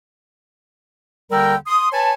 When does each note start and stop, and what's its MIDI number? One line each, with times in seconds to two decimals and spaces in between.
1.31 1.55 39
1.31 1.55 50
1.31 1.55 55
1.31 1.55 70
1.31 1.55 79
1.31 1.55 88
1.67 1.88 84
1.67 1.88 87
1.92 2.13 71
1.92 2.13 73
1.92 2.13 80
1.92 2.13 81